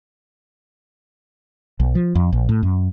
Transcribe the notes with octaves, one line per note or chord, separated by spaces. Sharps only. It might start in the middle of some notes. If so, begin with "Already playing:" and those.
B1
F3
F2
A#1
A2
F#2